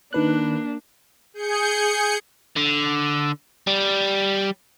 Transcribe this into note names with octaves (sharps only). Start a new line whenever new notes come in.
D#3 A#3 D4 B4 F#6
G#4 G6 C#7
D3
G3